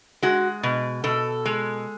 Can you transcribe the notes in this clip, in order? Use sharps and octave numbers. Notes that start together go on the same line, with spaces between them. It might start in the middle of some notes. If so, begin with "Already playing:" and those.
G#3 F#4
B2
B2 A4
G#3